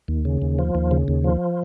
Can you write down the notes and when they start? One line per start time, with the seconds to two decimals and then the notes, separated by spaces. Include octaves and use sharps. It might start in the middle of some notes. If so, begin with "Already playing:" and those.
0.08 D#2
0.25 C#3
0.42 D#2
0.59 F3
0.75 D#2
0.91 C#3
1.08 D#2
1.24 F3